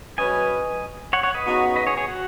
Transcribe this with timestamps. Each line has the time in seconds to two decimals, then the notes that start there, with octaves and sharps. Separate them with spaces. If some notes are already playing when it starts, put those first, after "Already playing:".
0.18 C#3 F#3 C#4 B4 D#5 G#5
1.13 C#5 F#5
1.23 C#5 F#5
1.34 B4 D#5
1.45 C#3 B3 D#4 F#4
1.76 B4 D#5
1.87 G#4 C#5
1.97 G#4 C#5
2.08 F#4